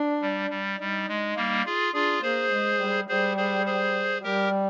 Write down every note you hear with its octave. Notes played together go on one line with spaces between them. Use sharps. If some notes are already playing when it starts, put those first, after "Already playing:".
Already playing: D4
G3
G3
G3 D#4
G#3
G3 A#3
F4 G#4
D4 F4 G#4
A#3 G#4 C5
G#3
G3
G3 G#4 C5
G#4 C5
G#4 C5
G3 G4 A#4